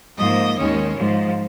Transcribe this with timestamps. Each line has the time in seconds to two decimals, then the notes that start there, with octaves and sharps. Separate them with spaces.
0.18 G#2 F3 A#3 D#5
0.58 D#2 D#3 G#3 C#4
0.97 G#2 F3 G#3